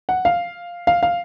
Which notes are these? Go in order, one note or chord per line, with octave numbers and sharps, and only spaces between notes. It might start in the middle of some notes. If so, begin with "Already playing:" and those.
F#5
F5
F5
F5